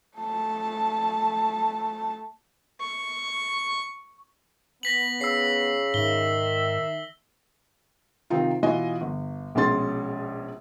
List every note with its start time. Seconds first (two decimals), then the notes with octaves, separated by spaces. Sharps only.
0.17 A3 A5
2.81 C#6
4.83 B3 A#6 B6 F#7
5.21 C#3 E6 C7
5.94 G#2 D#3 E5 G7
8.30 C3 D#3 C4 D#4 F4
8.63 B2 E3 F4 F#4 D#5 G#5
9.01 G1
9.55 A#1 B2 G#3 C#4 C6 A6